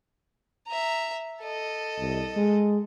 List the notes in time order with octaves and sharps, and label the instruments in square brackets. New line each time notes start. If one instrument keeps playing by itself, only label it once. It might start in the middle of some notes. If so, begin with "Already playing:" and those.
[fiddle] E5 A#5
A4 D#5
[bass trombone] C2
G#3